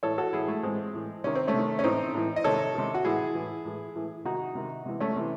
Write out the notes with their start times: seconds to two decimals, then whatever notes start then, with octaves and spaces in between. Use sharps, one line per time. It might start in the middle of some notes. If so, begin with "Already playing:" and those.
0.03 A2 E3 A4 C#5
0.18 F#4 A4
0.33 A2 E3 E4 G#4
0.48 A3
0.63 A2 E3 G#3 C4
0.94 A2 E3
1.24 C3 D#3 C#4
1.35 C4
1.48 A3 C#4
1.54 C3 D#3
1.79 C#4
1.84 A2 E3 C4 D#4
2.15 A2 E3
2.36 D#5
2.44 C3 D#3 A4 C#5
2.75 C3 D#3
2.95 F#4
3.05 A2 E3 E4 G#4
3.35 A2 E3
3.65 A2 E3
3.96 A2 E3
4.25 C3 D#3 D#4 F#4
4.55 C3 D#3
4.86 C3 E3
5.00 A3 C#4
5.16 C3 E3